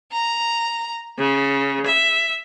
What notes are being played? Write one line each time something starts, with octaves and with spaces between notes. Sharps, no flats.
A#5
C#3
E5